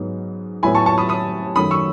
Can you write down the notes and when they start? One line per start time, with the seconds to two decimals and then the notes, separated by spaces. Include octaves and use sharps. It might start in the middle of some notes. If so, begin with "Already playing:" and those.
Already playing: G#2 F#3 B3 D#4
0.63 A2 F#3 B3 E4 G#5 B5
0.75 A5 C#6
0.86 A5 C#6
0.98 B5 D#6
1.09 B5 D#6
1.55 F#2 D#3 F#3 A3 B5 D#6
1.71 C#6 E6